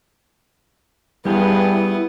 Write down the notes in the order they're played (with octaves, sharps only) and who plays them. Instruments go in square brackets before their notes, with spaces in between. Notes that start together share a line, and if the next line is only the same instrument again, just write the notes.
[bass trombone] G2 [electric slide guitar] G3 G4 G#4 [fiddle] B3 [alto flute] E4